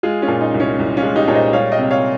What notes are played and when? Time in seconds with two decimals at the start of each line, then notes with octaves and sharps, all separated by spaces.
0.03 G#3 F4 G#4
0.22 C#4 F4
0.28 A#2
0.40 D#4
0.54 C2
0.60 C#4
0.79 C2
0.97 C#4 F4
1.03 G#3
1.15 D#4 G4
1.28 A#2 C#5
1.34 C5 D#5
1.53 G3 C#5 F5
1.71 D#5 G5
1.78 C3
1.90 C#5 F5